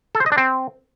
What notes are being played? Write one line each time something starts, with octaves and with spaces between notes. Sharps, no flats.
A4
C5
D#5
D4
C4